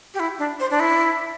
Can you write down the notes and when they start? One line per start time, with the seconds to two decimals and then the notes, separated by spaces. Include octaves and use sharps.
0.14 G4
0.20 E4
0.39 D4
0.60 C5
0.71 D4
0.80 E4